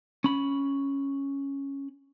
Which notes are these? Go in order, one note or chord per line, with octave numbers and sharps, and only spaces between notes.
C#4 B5